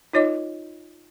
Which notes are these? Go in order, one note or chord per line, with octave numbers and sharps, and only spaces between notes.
D#4 F4 C#5 D#5 D6